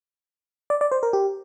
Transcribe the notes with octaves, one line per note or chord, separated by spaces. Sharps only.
D5
D5
C5
A#4
G4